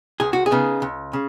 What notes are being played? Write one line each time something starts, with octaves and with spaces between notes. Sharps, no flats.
C#2 G#4
F#4
G#4
C#3 B3 D#4
C#2
C#3